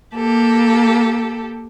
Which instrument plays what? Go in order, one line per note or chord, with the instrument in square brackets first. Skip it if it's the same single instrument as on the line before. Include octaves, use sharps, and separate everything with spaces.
[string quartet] A#3 G4 A4